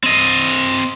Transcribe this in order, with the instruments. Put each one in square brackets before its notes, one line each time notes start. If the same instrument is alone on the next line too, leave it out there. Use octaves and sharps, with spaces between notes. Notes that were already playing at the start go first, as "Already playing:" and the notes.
[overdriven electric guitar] C4 D#5